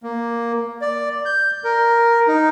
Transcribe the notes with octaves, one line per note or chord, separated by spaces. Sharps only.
A#3
D5
G6
A#4
D#4